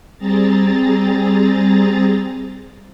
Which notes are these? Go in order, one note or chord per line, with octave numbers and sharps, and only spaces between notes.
G3 C4 G#4 A#5 A6